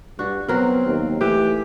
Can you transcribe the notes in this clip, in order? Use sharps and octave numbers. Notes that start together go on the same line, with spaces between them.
G2 D4 F#4
F#3 B3 C4 A#4
D#2
E3 A3 G4